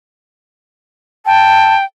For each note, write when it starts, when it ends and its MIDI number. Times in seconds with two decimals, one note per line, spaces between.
1.26 1.85 79
1.26 1.75 81